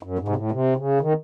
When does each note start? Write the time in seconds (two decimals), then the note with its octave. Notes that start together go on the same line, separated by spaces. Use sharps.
0.03 F#2
0.19 G#2
0.28 C3
0.36 A2
0.52 C3
0.77 C#3
1.01 D#3